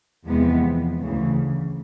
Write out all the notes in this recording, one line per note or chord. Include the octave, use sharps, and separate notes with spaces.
E2 C3 F3 G#3 B3
D2 C#3 E3